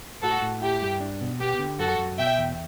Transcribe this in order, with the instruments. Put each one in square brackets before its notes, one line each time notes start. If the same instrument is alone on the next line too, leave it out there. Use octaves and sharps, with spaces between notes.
[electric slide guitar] A2 [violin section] F#4 A4
[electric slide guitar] A2
[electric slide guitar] E4 [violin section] G4
[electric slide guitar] G2
D4
B2
[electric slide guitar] B3 [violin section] G4
[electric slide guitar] D3
[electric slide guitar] F#2 [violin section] F#4 A4
[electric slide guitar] F#2
[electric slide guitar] B2 [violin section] E5 G5
[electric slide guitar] E2